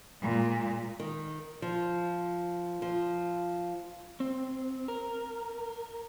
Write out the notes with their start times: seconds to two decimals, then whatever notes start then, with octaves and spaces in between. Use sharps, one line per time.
0.22 A#2 G#3
1.00 D#3
1.62 F3
2.82 F3
4.20 C4
4.88 A#4